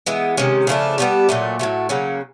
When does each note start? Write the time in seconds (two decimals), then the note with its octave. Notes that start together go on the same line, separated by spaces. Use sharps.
0.06 E3 G#3 B3
0.37 C3 D#3 G#3 C#4
0.67 C#3 F3 A3 D4
0.98 G3 B3 D4 G4
1.29 A#2 F#3 A3
1.59 A2 F#3 A3
1.89 C#3 F#3 A#3 C#4